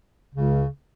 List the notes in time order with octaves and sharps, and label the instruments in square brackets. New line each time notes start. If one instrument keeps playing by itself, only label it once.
[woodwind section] C#2 C#3